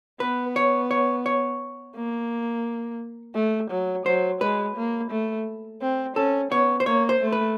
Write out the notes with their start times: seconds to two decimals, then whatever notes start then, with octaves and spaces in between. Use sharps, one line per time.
0.20 B3 B4
0.56 C#5
0.91 C#5
1.26 C#5
1.96 A#3
3.35 A3
3.71 F#3
4.06 F#3 C5
4.41 G#3 B4
4.76 A#3
5.11 A3
5.81 C4
6.16 C#4 A4
6.51 B3 C#5
6.80 C5
6.86 A#3 C#5
7.09 C5
7.21 A3
7.32 B4